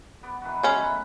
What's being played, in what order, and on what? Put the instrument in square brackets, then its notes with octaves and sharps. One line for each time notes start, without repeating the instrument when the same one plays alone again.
[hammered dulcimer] B3 D5
D#3 E3 F#4
[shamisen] G#3 C#4
[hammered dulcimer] F#3 A3 B5